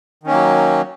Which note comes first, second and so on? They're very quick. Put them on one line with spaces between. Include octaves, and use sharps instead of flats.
D#3 C#4 A#3 F#3